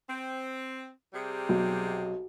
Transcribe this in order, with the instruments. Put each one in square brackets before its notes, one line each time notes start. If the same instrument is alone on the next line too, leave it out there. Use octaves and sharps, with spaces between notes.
[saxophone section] C4
C3 G3 G#4
[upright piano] B1